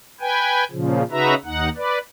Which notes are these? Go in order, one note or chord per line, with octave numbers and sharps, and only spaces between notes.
B4 G5 G#5
A#2 C#3 F3
C#3 D#4 F#4 B4 E5 A#5
D#2 D#4 F#5
B4 D5